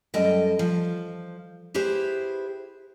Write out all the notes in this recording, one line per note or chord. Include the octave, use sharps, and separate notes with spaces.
F#2 G3 A4 D#5 G5
F3
E4 G4 G#4 B4 C5